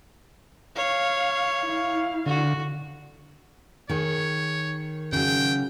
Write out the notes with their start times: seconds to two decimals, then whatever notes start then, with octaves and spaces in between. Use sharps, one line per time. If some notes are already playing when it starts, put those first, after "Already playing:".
0.76 C#5 F5
1.66 E4 F5
2.26 D3 F#4
3.89 D#3 G#4 C#5
5.13 C#3 F#3 G5